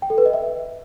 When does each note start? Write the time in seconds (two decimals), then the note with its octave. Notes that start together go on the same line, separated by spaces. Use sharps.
0.02 G5
0.10 A4
0.18 B4
0.26 D#5
0.33 E5